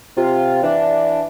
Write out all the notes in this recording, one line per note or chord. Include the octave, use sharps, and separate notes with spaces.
C3 F4
E3 D4